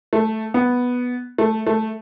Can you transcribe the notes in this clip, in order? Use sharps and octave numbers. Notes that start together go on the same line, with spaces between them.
A3
B3
A3
A3